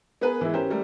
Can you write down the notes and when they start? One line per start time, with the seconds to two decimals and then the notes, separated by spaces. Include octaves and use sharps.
0.21 B3 G#4 A#4 B4
0.41 E3 G#3 E4
0.54 C#4 G4 A#4 C5
0.70 G3 A3 A#4